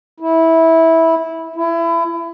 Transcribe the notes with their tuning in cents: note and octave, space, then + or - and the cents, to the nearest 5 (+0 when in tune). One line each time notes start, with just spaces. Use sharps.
E4 -15
E4 +25